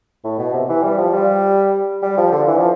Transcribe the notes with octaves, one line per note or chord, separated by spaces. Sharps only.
A2
B2
C3
E3
G3
F3
G3
G3
F3
D3
E3
F3